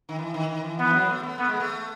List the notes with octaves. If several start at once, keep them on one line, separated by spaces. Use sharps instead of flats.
D#3
E3
D#3
D#3
E3
E3 B3
F#3
A3
B3
A3 B3
G#3
A3